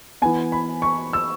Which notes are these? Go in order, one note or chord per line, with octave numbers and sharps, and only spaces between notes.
E3 B3 G#5
B5
C#6
E6